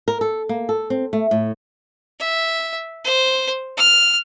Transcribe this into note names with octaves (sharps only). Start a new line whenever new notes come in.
A#4
A4
A#3
A4
C4
A3
A2
E5
C5
F6